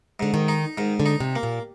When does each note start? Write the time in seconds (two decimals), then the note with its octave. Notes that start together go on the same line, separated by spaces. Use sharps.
0.20 G#2 D3
0.34 D#3
0.48 D#4
0.78 G#2 D#3
1.00 D3
1.06 D#4
1.20 C3
1.35 A#3
1.43 A#2